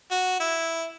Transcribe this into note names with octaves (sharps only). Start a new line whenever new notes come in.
F#4
E4